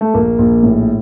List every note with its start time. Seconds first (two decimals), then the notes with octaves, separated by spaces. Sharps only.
0.01 A3
0.14 A#1 A#3
0.38 A#1
0.63 A2